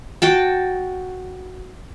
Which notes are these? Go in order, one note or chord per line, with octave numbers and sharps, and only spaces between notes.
F#4 G5 A5